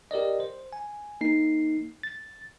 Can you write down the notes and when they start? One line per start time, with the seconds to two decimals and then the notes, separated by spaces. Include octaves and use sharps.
0.11 G4 A#4 D5 D#5
0.40 C5
0.73 G#5
1.21 A#3 D#4 C7
2.03 A6